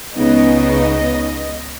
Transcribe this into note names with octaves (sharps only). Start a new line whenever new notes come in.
C#2 C#3 B3 D#4 D#5